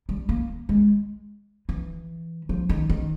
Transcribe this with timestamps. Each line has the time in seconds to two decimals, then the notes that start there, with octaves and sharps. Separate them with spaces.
0.09 G3
0.29 A#3
0.69 G#3
1.69 E3
2.49 F3
2.69 D#3
2.89 D#3